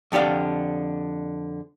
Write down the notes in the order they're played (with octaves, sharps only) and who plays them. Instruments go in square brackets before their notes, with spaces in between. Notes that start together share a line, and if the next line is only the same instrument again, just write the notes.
[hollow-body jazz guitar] F2 D3 G4 D5 F5